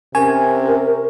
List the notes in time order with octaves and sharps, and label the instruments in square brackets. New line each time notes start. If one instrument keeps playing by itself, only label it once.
[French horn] C3 [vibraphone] C#4 [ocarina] A#4 [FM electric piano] G#5